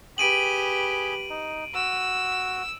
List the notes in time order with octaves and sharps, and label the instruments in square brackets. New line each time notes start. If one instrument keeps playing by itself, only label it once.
[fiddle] G4 B4 [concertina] G#4 [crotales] D7 D#7 F#7
[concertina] D#4
[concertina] F#4 [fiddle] E6